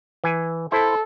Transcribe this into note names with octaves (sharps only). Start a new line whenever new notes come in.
E3 G#5
E4 A4 C5